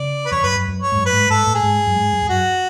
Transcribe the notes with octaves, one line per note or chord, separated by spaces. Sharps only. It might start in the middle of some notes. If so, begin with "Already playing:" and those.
Already playing: C#3 D5
B4
F2 C#5
F#2 B4
F#2
F#2
C#5
G#2
F#2
B4
G#2
G#2 A4
A2
G#4
G#2
F#2
G#2
F#2
F2
F#2 F#4